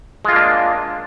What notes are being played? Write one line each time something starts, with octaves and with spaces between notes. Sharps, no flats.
G#3 A#3 D4 F4